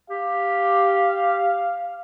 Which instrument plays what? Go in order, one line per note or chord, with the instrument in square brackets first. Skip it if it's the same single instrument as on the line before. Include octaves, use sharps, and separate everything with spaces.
[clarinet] G4 [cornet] F5